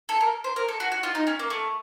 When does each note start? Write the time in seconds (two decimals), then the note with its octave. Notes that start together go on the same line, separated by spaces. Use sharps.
0.09 A4
0.21 A#4
0.44 C5
0.56 A#4
0.68 A4
0.80 F#4
0.92 F#4
1.03 F4
1.15 D#4
1.27 C#4
1.39 A#3
1.50 A3